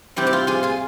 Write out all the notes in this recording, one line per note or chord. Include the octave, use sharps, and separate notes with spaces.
C3 G3 C4 E4 G4
G4
F4
F4 G#4
F4 G#4